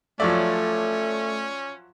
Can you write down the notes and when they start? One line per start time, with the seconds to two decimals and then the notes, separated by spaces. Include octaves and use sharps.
0.20 F3 F#3 A3 C#4 C#5 D5 E5